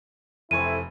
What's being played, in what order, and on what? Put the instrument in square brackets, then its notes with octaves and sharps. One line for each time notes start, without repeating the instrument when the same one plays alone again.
[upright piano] F1 G#5 C#6 [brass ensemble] C4 E4 A4 [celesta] D#7